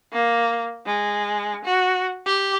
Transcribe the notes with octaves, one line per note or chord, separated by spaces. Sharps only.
A#3
G#3
F#4
G4